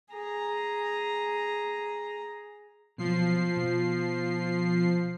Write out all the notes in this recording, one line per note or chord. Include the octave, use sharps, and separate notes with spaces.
G#4 A#5
B2 F3 F#3 C7
B2